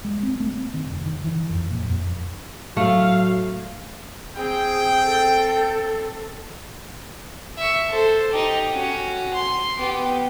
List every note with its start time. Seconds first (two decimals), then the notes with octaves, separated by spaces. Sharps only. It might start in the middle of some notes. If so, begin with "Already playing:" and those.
0.05 G#3
0.23 C4
0.40 A3
0.54 C4
0.74 D#3
0.87 F1
1.06 D#3
1.24 E3
1.49 F2
1.71 A#2
1.85 F2
2.77 A2 F#3 A3 F5
4.36 C4 G#4 G5
5.03 A4
7.58 E5 C#6
7.89 A4 C5
8.32 D#4 G4
8.71 C#4 F#4
9.34 C6
9.78 B3 G4